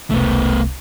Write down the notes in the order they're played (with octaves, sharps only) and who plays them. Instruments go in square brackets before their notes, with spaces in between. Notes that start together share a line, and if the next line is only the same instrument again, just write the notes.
[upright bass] E1 C2 [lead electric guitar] A3 B3